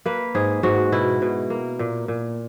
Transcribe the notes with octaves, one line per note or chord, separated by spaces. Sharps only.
A#3 B4
G#2 G#4
G#2 F#4
B2 E4
B2
A#3
A#2
A#2